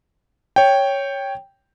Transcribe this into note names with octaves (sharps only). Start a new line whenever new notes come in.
C#5 G5